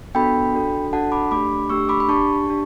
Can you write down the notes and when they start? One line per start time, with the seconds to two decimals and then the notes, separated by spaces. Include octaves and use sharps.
0.15 B3 D4 F#4 A4 G5 B5
0.53 D4 F#4 A4
0.93 D4 F#4 A4 F#5 A5
1.12 B5 D6
1.31 A3 D4 G4 B5 D6
1.70 A3 D4 G4 C#6 E6
1.89 B5 D6
2.00 B5
2.09 D4 G4 A5 C#6
2.47 D4 G4